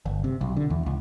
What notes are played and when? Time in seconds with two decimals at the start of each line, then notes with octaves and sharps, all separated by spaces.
0.06 G1
0.24 C3
0.41 B1
0.56 D3
0.70 E2
0.86 C#2